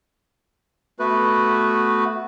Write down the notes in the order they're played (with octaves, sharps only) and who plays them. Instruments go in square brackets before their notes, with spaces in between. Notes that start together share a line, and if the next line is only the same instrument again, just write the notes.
[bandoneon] A3 B3 F#4 B4